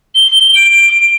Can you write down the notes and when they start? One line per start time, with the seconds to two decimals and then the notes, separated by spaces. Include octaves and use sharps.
0.15 G7
0.55 D7